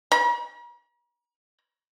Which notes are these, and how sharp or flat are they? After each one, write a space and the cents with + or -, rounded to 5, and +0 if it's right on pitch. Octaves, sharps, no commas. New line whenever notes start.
A#5 +45